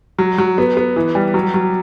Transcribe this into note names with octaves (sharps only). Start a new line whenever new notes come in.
F#3
F#3
B3
B3
E3
G3
F#3
F#3